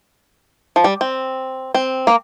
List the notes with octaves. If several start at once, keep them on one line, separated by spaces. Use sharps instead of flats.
F3
G3
C4
C4
A#3